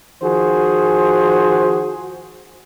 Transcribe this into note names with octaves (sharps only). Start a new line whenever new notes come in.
D#3 F3 F#4 G#4 C5